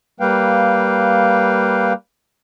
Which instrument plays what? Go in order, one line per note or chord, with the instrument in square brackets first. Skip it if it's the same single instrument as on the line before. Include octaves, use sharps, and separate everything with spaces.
[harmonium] G3 A#3 B4 F5 G5